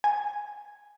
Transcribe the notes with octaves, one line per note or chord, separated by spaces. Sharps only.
G#5